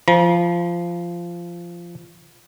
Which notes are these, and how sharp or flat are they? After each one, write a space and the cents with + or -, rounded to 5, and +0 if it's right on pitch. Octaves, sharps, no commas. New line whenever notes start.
F3 -15 A#5 +45